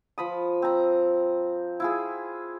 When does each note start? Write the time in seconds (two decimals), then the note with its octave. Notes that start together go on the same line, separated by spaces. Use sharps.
0.18 F3 B5 D#6
0.62 C4 A#5
1.80 E4 F4 G#4